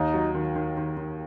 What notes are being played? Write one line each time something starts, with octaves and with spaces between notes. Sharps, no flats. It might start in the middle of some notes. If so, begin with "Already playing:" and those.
Already playing: D#2 D#4
F#3
D#3
D#3
D#3
D#3